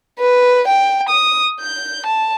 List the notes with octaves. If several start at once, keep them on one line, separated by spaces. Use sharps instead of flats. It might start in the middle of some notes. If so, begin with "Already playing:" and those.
B4
G5
D#6
G6
A5